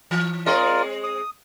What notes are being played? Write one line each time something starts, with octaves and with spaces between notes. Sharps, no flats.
E3
G#3 C4 F4 A#4 D5 D#5
D#6